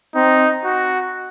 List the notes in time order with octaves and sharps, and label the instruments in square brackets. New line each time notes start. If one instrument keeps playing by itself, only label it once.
[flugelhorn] C4 [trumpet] D#4
[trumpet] F#4